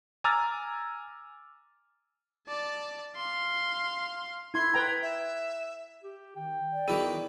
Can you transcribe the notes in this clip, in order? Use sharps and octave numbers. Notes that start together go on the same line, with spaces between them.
G#5 A#5 D6 E6 F6 A6
D5 A5
F5 C6
E4 C6 G#6
B4 G5 A#5
E5
G4
D#3 G5
D5
D#3 E3 B3 F#4 G#4